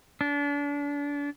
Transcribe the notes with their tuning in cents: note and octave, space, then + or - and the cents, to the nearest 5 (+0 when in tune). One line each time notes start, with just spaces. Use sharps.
D4 -35